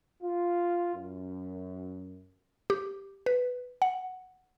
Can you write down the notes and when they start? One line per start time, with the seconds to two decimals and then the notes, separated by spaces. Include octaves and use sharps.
0.23 F4
0.95 F#2
2.70 G4
3.26 B4
3.82 F#5